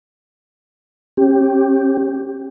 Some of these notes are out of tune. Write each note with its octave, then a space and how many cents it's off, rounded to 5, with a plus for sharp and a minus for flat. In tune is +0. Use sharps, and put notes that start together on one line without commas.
C#4 -35 G4 +0